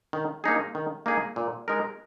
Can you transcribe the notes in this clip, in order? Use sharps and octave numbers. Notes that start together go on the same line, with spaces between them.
D#3
A#3 D#4 G#4
D#3
A#3 D#4 G#4
A#2
G#3 D#4 A#4